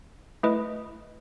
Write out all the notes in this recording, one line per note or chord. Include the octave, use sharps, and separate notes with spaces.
A3 E4 B4 D#5